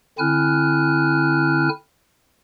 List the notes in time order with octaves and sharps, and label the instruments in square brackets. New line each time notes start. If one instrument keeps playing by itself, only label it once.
[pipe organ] D3 C4 E4 G#5 F6 F#6